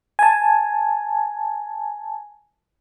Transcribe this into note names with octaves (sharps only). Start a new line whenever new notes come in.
G#5 A5